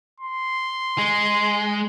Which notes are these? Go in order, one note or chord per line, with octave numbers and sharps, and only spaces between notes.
C6
G#3